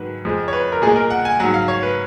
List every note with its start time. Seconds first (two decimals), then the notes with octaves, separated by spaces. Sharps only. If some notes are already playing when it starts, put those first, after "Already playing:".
Already playing: G#2 D#3 F#3 B4
0.25 F2 F3 G#3
0.48 C#5
0.53 B4
0.72 A#4
0.82 A#2 G#4
0.87 G#3
0.96 A#4
1.10 F#5
1.25 G#5
1.40 G#2 F#3 F#5
1.54 F5
1.68 C#5
1.83 B4